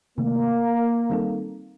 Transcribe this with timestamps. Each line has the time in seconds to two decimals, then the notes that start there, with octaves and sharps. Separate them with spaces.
0.18 C3 D#3 A3 A#3
1.10 D#3 G3 C4 D#4 A4